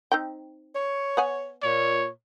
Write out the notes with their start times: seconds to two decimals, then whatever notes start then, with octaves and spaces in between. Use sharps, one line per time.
0.12 C4 D#4 G5
0.75 C#5
1.17 B3 F#5 G#5
1.63 A#2 C#5